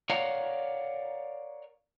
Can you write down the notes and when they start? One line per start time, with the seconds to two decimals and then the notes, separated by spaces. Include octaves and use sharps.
0.10 A#4 C#5 D5 F5 F#5 A#5